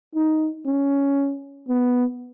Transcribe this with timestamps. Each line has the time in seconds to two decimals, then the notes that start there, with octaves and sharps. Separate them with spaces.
0.15 D#4
0.66 C#4
1.68 B3